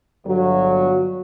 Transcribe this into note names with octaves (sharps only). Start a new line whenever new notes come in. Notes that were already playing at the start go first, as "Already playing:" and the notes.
G1 F#3